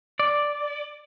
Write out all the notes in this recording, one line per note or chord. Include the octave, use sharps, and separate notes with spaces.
D5